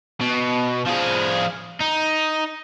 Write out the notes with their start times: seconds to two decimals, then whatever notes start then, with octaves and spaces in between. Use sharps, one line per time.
0.21 B2
0.87 F3 G#4
1.80 D#4